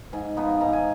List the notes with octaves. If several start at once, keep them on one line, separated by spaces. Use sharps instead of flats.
G#2 G#5
F3 B3 D#4
G#2 A#5
G#5